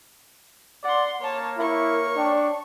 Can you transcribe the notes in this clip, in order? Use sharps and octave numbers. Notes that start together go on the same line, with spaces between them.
D5 F#5 C6
A#3 C#5 A5
E4 A#4 C#5 C#6
D4 G5